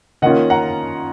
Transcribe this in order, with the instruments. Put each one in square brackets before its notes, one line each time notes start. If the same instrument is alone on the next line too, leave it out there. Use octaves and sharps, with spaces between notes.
[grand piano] D#3 A#3 C#4 F4 [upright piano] D#5 F#5
[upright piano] F#5 A#5